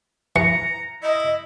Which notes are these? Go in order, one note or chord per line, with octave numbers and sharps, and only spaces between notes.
E3 A#5 C#7
E4 D#5